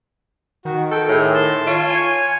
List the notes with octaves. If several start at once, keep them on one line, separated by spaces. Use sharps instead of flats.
D#3 F#4
A4 G5
A2 G#4
A5 C6
F4 C#5
G#5